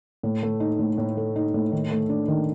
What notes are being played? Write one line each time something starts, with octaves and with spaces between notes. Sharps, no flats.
A2
A3
D#4
A2
A2
A3
D#4
A2
D#3
A3
D4
D#3